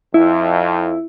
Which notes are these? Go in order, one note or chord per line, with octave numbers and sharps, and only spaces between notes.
F2 E4